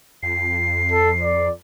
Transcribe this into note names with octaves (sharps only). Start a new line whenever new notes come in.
F2 C7
A4
D5